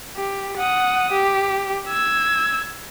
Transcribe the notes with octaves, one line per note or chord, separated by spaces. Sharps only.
G4
F#5 D#6
G4
E6 G#6